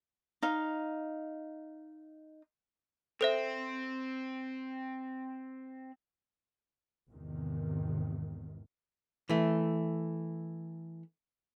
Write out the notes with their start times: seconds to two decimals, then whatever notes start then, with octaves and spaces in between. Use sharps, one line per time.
0.43 D#4 F5
3.21 C4 A4 C5 E5
7.11 G#1 E2 C3 D#3
9.29 E3 A3